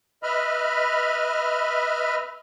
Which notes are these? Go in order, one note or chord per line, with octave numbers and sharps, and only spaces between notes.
B4 D#5 E5 B5 F6